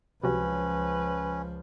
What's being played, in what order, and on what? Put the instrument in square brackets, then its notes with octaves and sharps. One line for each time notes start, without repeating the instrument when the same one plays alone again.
[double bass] C#2 F3 [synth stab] C3 F#3 [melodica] C#4 [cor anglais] B4